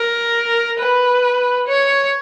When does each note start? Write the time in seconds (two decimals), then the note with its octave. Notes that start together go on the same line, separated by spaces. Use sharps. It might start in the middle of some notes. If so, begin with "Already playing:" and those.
Already playing: A#4
0.79 B4
1.68 C#5